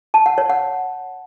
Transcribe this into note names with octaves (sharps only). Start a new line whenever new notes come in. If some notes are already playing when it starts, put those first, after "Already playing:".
A5
F#5
C#5
F#5